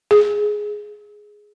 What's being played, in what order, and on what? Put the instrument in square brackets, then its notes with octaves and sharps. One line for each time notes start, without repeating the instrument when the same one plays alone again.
[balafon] G#4